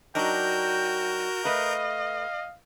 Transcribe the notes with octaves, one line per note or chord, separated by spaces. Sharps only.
F#3 D4 D#4 F#4 A#4 G5 G6
A3 B4 D#5 F5